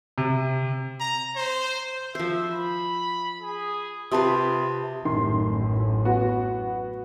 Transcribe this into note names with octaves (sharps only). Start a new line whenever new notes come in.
C3
A#5
C5
F3 C5 E5
B5
G#4
C3 F4 B4 A5 B5 C6 D#6
A1 F#2 A2 D#3 C6
B3 F#4